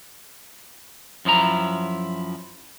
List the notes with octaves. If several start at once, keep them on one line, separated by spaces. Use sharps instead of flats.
F#2 F3 E4 A#5